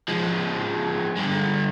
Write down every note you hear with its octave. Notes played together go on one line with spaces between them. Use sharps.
F3 G#3
G2 D3